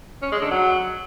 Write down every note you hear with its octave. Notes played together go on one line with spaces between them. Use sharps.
C#4
G#3
D3
F#3